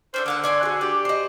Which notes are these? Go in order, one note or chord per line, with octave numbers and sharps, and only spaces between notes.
C#4 D4 A4 C5
D3 A#3 F5 F#5
C#5 D5 G#5 C6
F#4 G#4
G4 D5
C5 D#5